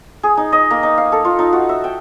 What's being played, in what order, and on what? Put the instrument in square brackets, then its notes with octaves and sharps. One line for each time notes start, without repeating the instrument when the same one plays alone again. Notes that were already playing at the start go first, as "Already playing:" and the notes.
[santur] G#4
D#4
D#5
A#3
D#4
F5
A4
F4
D#4
F#4
E5
G5